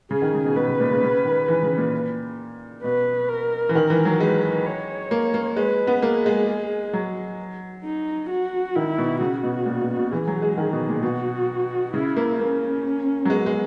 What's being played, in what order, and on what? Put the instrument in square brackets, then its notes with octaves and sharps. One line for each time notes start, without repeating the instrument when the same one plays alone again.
[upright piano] C#3 [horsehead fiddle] G#4
[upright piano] D#3
C#3
B2
[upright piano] B2 [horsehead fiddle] B4
[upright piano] C#3
A#2
C#3
C#3
D#3
E3
C#3
A#2
[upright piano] B2 [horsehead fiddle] B4
[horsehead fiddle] A#4
[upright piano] E3
D#3
E3
F#3
[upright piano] G#3 [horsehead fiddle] B4
[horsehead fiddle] C#5
[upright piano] A#3
A#3
[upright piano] G#3 [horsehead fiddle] B4
[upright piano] B3
[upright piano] A#3 [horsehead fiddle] G#4
[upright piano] G#3
F#3
[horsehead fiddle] D#4
F#4
[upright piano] D#3 [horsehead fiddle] E4
[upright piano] B2
[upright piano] C#3 [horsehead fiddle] F#4
[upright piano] B2
A#2
B2
B2
[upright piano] E3 [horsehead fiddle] G#4
[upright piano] F#3
G#3
D#3
B2
A#2
[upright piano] B2 [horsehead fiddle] F#4
[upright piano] C#3 [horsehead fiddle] E4
[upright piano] A#3
[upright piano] A#3 [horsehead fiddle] C#4
[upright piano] F#3
[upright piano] G#3 [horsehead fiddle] B3
[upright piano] G#3